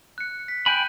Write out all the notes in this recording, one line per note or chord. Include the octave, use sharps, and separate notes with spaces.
F#6 C#7
B6
G5 G#5 B5 F#6 G6